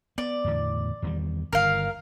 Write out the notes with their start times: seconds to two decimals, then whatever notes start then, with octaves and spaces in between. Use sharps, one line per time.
0.18 B3 D5
0.44 E2 A2 D3
1.02 E2 D#3 G3
1.53 G1 A#2 D#3 A#4 F5